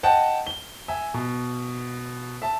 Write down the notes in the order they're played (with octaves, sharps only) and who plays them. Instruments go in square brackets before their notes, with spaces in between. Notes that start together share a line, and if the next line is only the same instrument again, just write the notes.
[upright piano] D#5 F#5 G5 A5
G7
E5 G#5
B2
E5 A5